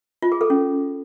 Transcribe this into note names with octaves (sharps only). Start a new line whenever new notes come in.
F4
G#4
A4
C#4